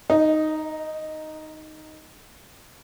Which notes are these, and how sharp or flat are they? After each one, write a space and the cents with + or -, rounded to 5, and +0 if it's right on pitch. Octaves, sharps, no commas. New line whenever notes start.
D#4 +0 D#5 +35